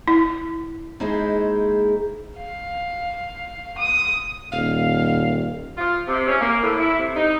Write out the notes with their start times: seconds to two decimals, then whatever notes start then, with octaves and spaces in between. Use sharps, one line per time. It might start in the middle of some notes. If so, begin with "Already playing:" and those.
0.08 E4
1.00 G#3 A#3 D#4 E4 G#4 C5
2.38 F5
3.78 D#6
4.52 D#1 F5
5.78 F4
6.07 C3
6.28 C#4
6.41 A#3
6.63 A2
6.79 E4
6.98 C3
7.16 D#4